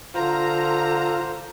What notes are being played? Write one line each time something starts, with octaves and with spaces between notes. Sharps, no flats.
D3 F4 C5 A#5